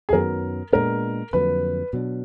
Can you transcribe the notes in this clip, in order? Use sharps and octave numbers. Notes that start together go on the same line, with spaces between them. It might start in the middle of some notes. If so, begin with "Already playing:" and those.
G#4
F#2 D#3 F#3 B3 A#4
A#2 G#3 B3 D4 A#4
F2 D3 F#3 A#3 B4
B2 F#3 D4